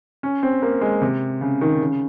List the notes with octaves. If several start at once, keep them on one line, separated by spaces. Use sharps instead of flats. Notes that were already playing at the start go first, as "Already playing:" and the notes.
C#4
C4
A#3
G#3
C3
C#3
D#3
C#3